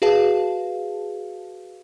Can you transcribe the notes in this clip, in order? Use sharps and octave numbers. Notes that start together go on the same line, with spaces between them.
F#4 G#4 B4 F5 A5